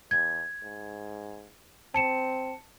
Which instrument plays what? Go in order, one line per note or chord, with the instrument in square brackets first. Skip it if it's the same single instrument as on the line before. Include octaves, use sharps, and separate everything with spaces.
[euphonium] E2 [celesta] G#6
[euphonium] G#2
[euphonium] C4 [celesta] A5 C#7 E7